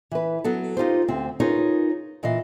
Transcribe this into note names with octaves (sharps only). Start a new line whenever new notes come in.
E3 B4
F#3 B3 A4
D#4 F4 G4 C5
D2 C4
D#4 F4 G#4 A#4 B4 C#5
A#2 E3 D#5 F5